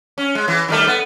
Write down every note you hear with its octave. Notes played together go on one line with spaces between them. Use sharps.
C#4
G#3
E3
D#3 G3 A3
B3